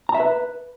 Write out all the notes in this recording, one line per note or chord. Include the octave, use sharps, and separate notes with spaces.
A#5
E5
B4